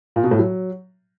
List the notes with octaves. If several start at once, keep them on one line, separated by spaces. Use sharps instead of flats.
A#2
B2
A2
F#3